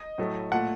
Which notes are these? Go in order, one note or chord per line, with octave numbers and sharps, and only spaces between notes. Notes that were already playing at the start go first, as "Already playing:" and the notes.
Already playing: D#5
A2 F#3 A3
A#2 A3 F#5